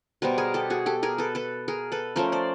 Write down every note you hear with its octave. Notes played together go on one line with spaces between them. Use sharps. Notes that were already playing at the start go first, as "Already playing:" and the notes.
B2 G3 B3 A#4 C5
G#4 A#4
G4 A4
F#4 G#4
G4 A4
G#4 A#4
A4 B4
A4 B4
G#4 A#4
A4 B4
F3 A3 C#4 A#4 C5
C5 D5